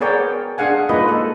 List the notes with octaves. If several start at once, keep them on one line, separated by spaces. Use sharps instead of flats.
B3 G#4 A#4 C#5 D5 G5
D4 G#4 F5 F#5 G#5
G#3 A#3 D#4 F4 B4 D#5
A4